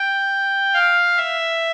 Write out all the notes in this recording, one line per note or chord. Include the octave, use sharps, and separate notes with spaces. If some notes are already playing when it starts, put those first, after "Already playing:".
Already playing: G5
F5
E5